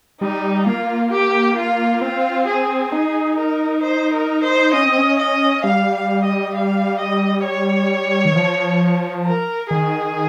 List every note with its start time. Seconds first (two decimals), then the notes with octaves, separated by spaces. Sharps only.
0.20 G3 D#4
0.66 A#3 F4
1.11 G4
1.56 F4
2.01 C4 F4
2.47 G#4
2.92 D#4 G#4
3.38 A#4
3.82 C5
4.13 A#4
4.43 C5
4.73 C#4 D#5
4.86 C4
4.98 C#4
5.18 D#5
5.63 G3 F5
5.94 F5
6.23 D#5
6.54 F5
6.99 D#5
7.45 C#5
8.25 D#3
8.36 F3
9.26 A#4
9.71 D#3 G#4